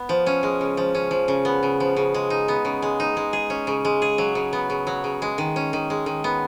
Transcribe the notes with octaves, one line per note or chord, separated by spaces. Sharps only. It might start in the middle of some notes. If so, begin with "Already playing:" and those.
Already playing: B3
F3
C#4
G#3
C#3
F3
C#4
F3
C#3
B3
C#3
F3
C#3
G#3
D#4
B3
C#3
G#3
D#4
G#3
G#4
C#4
C#3
G#3
G#4
F#3
C#3
B3
C#3
F#3
C#3
G#3
D#3
C#4
D#3
G#3
D#3
B3